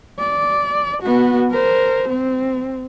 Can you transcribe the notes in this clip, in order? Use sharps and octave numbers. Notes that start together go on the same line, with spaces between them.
D5
B3 F#4
A#4 C5
C4